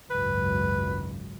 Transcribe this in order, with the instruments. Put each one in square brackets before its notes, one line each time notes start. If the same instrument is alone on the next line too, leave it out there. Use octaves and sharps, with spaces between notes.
[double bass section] G#1 C#2 F#2 [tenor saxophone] B4